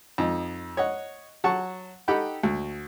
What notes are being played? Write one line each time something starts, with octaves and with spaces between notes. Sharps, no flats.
F2 D#4
C#5 D#5 F#5
F#3 F#5 A5 C#6
D#4 G4 A4 F#5 G5 B5
D2